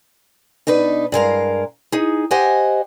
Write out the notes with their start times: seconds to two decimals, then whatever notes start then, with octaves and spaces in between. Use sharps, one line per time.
0.67 B2 D4 D#4 B4
1.12 G2 G#3 A#4 F5
1.92 D#4 G#4
2.31 G4 C5 D#5 F#5 G#5